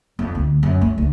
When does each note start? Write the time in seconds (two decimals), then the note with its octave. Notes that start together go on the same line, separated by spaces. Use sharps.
0.19 F2
0.35 D2
0.63 F#2
0.81 A3
0.98 D2